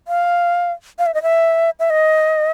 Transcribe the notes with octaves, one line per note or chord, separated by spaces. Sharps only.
F5
F5
E5
D#5
E5
E5
D#5